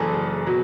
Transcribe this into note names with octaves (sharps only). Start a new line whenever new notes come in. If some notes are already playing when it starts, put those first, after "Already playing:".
Already playing: F#1 F#2 E3 G#4 A4 D5
B2 F#3